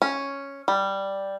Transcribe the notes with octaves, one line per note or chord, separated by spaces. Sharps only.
C#4
G3